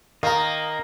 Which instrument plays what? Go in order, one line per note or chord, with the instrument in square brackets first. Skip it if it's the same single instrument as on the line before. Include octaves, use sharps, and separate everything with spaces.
[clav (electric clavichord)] D#3 [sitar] A#3 [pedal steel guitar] D#5 [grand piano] F5 A#5